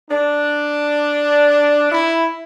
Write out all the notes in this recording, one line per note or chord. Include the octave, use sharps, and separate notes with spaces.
D4
E4